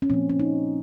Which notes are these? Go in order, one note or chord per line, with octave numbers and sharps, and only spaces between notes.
C#4
A#2 F3 A#3 C4
C#4
D#4